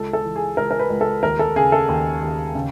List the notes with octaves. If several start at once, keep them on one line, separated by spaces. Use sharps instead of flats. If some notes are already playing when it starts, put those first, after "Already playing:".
Already playing: C#2 A4
A4
E3
G#4
C#2 A#4
A#4
B4
C#2
A4
D#2 A#4
A4
C#3 G#4
A4
D#2
D#2
C#3